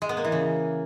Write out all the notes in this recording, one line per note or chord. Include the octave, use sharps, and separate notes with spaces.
G#3
B3
A#3
E3
C#3